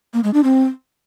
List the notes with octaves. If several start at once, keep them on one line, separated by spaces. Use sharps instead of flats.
A#3
G#3
D4
C4